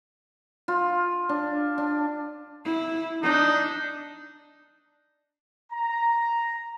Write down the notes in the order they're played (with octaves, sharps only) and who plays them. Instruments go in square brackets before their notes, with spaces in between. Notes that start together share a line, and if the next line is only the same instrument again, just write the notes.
[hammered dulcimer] F4
D4
D4
[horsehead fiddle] E4
[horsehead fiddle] D4 [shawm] D#4
[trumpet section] A#5